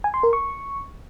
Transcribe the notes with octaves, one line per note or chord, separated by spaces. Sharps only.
G#5
C6
A#4
C#6